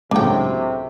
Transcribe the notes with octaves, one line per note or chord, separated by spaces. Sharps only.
C#2 A2 C3 F#3 G#3 A#3 D4 G5